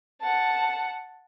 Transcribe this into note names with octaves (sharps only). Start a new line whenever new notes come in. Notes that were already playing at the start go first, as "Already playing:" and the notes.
F#5 A5